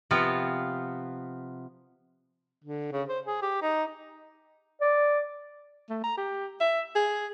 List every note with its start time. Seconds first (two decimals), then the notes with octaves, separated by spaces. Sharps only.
0.11 C3 F3 B3 F4
2.64 D3
2.92 C#3
3.09 C5
3.26 G#4
3.42 G4
3.62 D#4
4.81 D5
5.90 A3
6.04 A#5
6.17 G4
6.61 E5
6.95 G#4